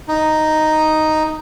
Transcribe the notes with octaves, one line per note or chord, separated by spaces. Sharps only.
D#4